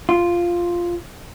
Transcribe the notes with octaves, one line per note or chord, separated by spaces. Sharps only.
F4